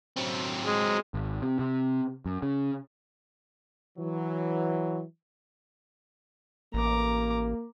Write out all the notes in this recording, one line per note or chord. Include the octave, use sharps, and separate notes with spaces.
F#3 C4
G#3
G#1
C3
C3
F#2
C#3
E3 F#3
A1 A#3 A#5 D6